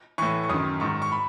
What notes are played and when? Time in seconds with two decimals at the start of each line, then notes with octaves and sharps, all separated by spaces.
0.18 A2 E3 C#6
0.44 C#6
0.49 F#2 D#3 D#6
0.80 G#2 D#3 C#6
1.02 C#6
1.12 B5